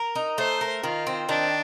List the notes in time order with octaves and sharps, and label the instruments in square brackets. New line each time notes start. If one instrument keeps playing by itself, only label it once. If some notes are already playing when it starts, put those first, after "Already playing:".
Already playing: [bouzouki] A#4
D#4
[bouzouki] A3 [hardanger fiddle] C5
[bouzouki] A#4
[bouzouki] D#3 [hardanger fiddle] F4
[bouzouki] C4
[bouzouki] D#3 [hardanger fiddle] D4